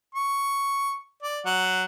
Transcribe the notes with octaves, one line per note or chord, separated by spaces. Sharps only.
C#6
D5
F#3 F#5